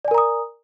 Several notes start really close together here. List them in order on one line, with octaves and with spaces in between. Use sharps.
D5 G#5 A#4 A#5 D#6